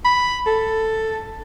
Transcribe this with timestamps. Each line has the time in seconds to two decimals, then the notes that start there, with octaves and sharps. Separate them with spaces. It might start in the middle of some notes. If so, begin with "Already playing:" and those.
0.05 B5
0.46 A4